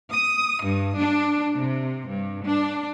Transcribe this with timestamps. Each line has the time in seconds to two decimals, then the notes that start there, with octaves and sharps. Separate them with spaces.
0.11 D#6
0.61 G2
0.98 D4
1.57 C3
2.08 G2
2.45 D4